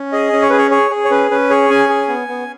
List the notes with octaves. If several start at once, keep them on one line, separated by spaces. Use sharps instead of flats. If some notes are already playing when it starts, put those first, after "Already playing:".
Already playing: C#4
G#4 D#5
C#4
C#5
G#4 B4
C#5
G#4 C#5
G#4
C#5
C#4 B4
C#4 B4
G#4 C#5
C#4 G#5
G#4
B3
B3